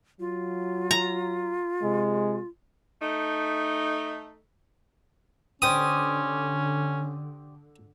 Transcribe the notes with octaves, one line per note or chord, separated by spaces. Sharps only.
F#3 F4
A#5
C3 G#3
A3 D#4
D3 C#4 G4 C5 D5 D#6